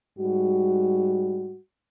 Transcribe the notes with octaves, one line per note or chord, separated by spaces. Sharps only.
G#2 G3 F#4